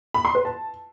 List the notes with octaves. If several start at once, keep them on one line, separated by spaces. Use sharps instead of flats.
B5
C6
B4
A5